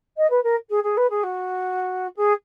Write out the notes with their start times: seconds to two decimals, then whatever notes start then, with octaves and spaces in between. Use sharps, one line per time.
0.17 D#5
0.30 B4
0.43 A#4
0.69 G#4
0.83 G#4
0.97 B4
1.10 G#4
1.23 F#4
2.16 G#4